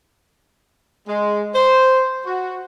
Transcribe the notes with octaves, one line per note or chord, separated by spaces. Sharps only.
G#3
C5
F#4